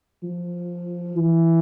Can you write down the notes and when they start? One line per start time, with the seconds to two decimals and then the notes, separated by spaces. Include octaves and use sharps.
0.23 F3
1.16 E3